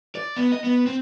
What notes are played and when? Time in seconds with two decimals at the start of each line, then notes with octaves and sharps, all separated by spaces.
0.15 D5
0.36 B3
0.52 D#5
0.64 B3
0.86 C4